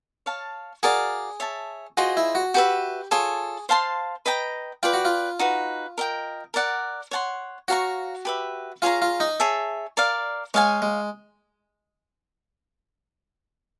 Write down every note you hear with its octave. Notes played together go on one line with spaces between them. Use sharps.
C#5 F5 A5
F#4 G#4 A#4 D5 F5
C#5 E5 A5
F4 F#4 G#4 C5 D#5
E4
F#4
F#4 G4 B4 E5
F4 G#4 A4 C#5
C5 F5 A5 C6
B4 D#5 G5 A#5
F4 B4 D5 G5
F#4
F4
D#4 F#4 B4
A#4 D#5 G5
A#4 D5 F#5
C#5 F#5 A5 C6
F#4 C#5 F5 A#5 C#6
G4 B4 E5
F4 G#4 C#5 F5 A#5
F4
D#4
G#4 C#5 E5 A5
A#4 D5 F5
G#3 C#5 F5 G#5
G#3